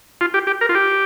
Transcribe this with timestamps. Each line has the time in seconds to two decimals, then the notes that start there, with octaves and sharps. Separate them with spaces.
0.21 F4
0.34 G4
0.47 G4
0.61 A#4
0.69 F4
0.75 G4